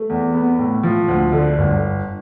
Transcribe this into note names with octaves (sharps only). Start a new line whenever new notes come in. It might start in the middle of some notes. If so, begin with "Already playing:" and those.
Already playing: A3
E2
B3
A2
F3
D2
D3
G1